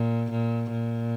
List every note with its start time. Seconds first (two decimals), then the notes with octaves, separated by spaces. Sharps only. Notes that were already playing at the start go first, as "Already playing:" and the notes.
Already playing: A#2
0.30 A#2
0.72 A#2